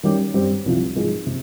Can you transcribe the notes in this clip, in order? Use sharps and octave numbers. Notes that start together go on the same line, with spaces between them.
D#3 G3 C#4 G4
G2 G3 C4 G4
C2 C3 F3
G#2 F3 G#3 D#4 G#4
C3